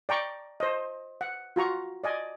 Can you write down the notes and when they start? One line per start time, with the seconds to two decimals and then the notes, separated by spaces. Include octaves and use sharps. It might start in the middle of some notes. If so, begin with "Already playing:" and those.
0.09 D5 G5 A#5 C#6
0.60 C5 D#5
1.21 F#5
1.56 F4 F#4 A#5 C#6
2.04 D5 D#5 G#5